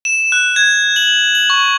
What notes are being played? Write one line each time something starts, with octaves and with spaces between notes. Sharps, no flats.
E7
F#6
G#6
F#7
F#7
C#6